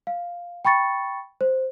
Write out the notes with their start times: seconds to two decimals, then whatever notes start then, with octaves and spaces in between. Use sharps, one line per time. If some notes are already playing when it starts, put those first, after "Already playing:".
0.07 F5
0.65 G5 B5 C#6 A6 C#7
1.41 C5